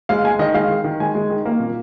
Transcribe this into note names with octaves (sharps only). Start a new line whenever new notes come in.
G#3 F5
G#3 G#5
D#3 D#5
G#3 F5
D#3
D#3
G#3 G#5
G#3
D#3
A#3
A#2